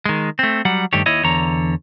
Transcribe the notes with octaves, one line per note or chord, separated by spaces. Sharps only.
D#3 G#3
A3 C4
F#3 G3 F#5
G2 D#3 A3 G4 C#5
D#2 E4 C#5 D#5
E2 D3 C#5 A#5